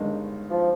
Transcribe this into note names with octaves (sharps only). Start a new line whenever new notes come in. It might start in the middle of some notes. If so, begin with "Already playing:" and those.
Already playing: G1 G2 D#3 G#3 D#4
F3